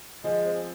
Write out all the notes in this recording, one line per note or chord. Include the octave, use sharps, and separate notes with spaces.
F3 G#3
C4